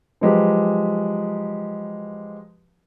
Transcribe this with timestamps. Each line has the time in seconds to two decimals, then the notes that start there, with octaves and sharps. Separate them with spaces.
0.21 F3 F#3 G#3 G4 B4 D#5